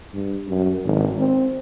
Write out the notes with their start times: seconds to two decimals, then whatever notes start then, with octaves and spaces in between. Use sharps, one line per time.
0.14 G2
0.48 F#2
0.84 G#1
1.18 C4